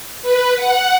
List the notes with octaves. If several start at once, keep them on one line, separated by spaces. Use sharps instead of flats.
B4
F#5